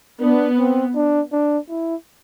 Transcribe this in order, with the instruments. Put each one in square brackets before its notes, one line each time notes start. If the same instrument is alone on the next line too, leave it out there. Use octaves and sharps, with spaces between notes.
[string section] B3 [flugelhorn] D4
[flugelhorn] C4
D4
D4
E4